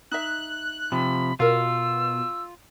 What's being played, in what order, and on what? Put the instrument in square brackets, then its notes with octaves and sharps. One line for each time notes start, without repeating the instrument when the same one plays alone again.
[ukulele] D#4 E5 [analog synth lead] F#6
[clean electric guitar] C3 F3 [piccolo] B5
[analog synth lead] B2 [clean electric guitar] F4 [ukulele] A#4 F5 [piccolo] E6